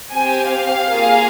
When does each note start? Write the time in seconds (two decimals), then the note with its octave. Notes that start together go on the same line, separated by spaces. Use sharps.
0.13 C4 G4 G#5
0.49 F5
0.86 A#3 F4 G#4